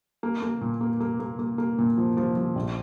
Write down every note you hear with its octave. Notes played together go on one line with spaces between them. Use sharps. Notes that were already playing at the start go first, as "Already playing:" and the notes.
A#3
A#3
A#2
A#3
A#3
A#3
A#3
A#3
A#2
F3
F3
F3
A#1